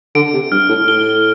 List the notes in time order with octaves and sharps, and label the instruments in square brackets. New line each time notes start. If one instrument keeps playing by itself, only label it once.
[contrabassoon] D3 [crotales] D7
[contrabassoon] C3
[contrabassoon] G2 [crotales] F6
[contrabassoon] A2
[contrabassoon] A2 [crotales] G7